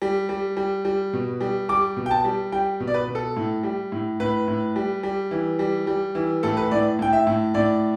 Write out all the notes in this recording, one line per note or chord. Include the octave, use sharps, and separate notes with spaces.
G3
G3
G3
G3
B2
G3
G3 D6
B2
G5
A5
G3
G3 G5
B2
D5
B4
B2
A4
A2
G3
A2
A2 B4
A2
G3
G3
E3
G3
G3
E3
A2 A4
B4
A2 D5
A2 G5
E5
A2
A2 D5